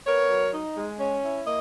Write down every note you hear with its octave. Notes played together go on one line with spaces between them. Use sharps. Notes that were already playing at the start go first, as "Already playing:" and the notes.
B3 A#4 C#5
F#3
D#4
G#3
C#4
E4
A#3 D#5